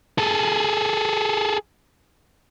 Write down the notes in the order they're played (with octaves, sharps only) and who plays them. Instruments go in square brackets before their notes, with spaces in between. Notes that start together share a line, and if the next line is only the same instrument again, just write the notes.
[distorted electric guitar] G#4 A4